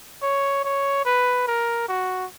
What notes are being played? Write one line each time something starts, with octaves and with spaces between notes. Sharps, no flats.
C#5
C#5
B4
A#4
F#4